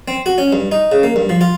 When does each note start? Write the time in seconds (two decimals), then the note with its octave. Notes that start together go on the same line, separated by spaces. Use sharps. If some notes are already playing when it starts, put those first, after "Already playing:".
0.08 C4
0.26 F#4
0.38 C#4
0.53 G2
0.72 D#4
0.92 C#3
1.03 A#3
1.16 G2
1.29 F3
1.41 F4